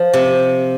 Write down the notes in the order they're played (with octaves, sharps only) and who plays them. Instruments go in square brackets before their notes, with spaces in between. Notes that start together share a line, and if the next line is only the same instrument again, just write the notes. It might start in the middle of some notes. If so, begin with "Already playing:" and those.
Already playing: [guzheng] F3
C3